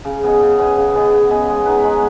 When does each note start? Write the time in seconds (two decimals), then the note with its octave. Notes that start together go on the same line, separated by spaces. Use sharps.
0.05 C#3
0.23 B3 G#4 D#5
0.41 C#3
0.58 B3 G#4 D#5
0.76 C#3
0.95 B3 G#4 D#5
1.12 C#3
1.29 B3 G#4 D#5
1.48 G#3
1.66 B3 D#4 B4
1.84 G#3